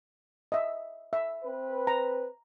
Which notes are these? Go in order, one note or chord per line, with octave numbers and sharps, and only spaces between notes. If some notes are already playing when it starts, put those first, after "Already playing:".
D#5 E5
E5
C4 B4
A#5